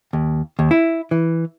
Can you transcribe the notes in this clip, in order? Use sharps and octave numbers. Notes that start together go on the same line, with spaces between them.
D#2
D#2
E4
E3